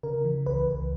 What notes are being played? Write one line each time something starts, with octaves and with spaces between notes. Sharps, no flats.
C#3 A#4
E3
C#2 B4
C#2